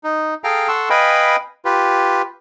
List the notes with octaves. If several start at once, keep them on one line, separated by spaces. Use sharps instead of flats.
D#4
G#4 A4 F5 G5 A#5 F6
A4 F#5 C6 C#6 E6
B4 D#5 F5 G5 G#5 B5
F4 G4 B4